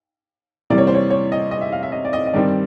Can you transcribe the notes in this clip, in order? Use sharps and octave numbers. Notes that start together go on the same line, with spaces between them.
C3 E3 G3 A#3 D5
C#5
C5
C#5
C#5
D#5
D#5
E5
F5
E5
D#5
D5
D#5
D#5
G2 D#3 G3 C4 D5